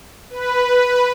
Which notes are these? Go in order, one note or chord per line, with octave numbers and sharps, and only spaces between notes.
B4